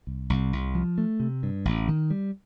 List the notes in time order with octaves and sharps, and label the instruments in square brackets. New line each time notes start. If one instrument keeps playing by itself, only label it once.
[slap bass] C2
C2
C2
F3
A3
C3
G2
A1
D#3
G3